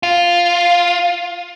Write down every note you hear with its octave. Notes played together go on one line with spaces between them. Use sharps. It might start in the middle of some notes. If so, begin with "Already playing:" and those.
F4